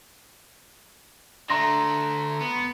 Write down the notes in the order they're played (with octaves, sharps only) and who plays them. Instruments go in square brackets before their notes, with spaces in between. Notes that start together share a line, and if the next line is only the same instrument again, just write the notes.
[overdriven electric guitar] D3 A3 [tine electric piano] A#5 C6 A#6
[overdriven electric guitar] B3